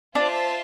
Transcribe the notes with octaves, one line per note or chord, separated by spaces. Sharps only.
D4 F4 C5 E5 A5